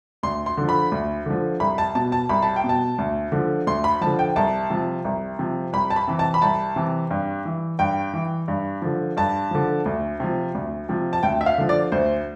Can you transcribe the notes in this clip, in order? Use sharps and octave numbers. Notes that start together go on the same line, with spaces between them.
D2 C6
C6
D3 F3
B5
D2
D3 F3
C2 B5
A5
B2 A5
A5
C2 B5
A5
G5
B2
A5
D2
D3 F3
D2 C6
B5
D3 F3 A5
G5
C2 A5
C3 F3
C2
C3 F3
C2 B5
A5
B5
C3 E3
A5
B5
C2 A5
C3 E3
G2
E3
G2 G5
E3
G2
D3 F3
G2 A5
D3 F3
D2
C3 F3
D2
C3 F3
A5
D2 G5
E5
F5
D3 F3
D5
D2 C5